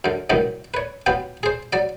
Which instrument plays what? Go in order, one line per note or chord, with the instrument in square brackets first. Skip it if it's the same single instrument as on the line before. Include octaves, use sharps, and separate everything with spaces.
[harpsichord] F#2 D3
C2 G2 A#2 D#3 F#3
B4 C#5
F#3 B3 F4 G4
G#4 C5
F#3 D5